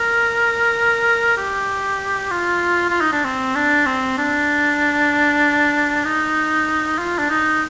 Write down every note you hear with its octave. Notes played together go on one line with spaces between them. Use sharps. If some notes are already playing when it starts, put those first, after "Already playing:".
Already playing: A#4
G4
F4
F4
D#4
D4
C4
D4
C4
D4
D#4
F4
D4
D#4